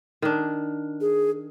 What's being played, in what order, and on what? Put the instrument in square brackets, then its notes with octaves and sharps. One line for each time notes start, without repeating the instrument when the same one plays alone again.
[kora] D#3 D4
[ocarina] G#4